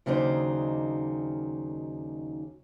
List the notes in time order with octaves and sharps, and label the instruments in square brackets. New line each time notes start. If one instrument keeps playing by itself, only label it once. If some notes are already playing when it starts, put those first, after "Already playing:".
[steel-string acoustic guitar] D#2 C#3 F#3 D4 D#4 C5